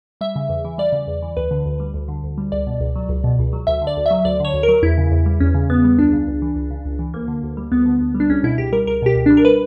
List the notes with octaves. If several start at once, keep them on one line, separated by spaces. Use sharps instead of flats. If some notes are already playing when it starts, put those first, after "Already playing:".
G3 E5
C#3
E2
E3
G3 D5
C#3
E2
E3
D2 B4
D3
D2
G3
D2
D3
D2
G3
C#2 D5
B2
C#2
F#3
C#2
B2
C#2
F#3
D2 E5
D3
D5
D2
E5
F#3
D2 D5
D3 C#5
D2
A#4
F#3
E2 E4
C#3
E2
G3
E2 C#4
C#3
E2 B3
G3
C#2 D4
C#3
C#2
E3
C#2
C#3
C#2
E3
D2 A#3
D3
D2
G3
D2 B3
D3
D2
G3
D4
C#2 C#4
B2 E4
C#2 G4
G3 A#4
C#2 A#4
B2 G4
C#2
G3 D4
A#4
B4